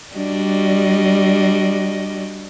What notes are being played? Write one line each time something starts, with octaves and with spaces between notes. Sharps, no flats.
G3 D4 F#4 D#5